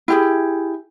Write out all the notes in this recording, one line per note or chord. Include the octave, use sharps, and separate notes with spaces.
E4 G4 G#4